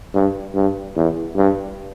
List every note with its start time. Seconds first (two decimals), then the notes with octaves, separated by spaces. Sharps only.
0.14 G2
0.54 G2
0.96 E2
1.36 G2